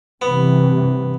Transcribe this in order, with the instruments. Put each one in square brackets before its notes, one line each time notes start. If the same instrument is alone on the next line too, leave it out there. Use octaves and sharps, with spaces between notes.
[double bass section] G2 C3 E3 [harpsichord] B3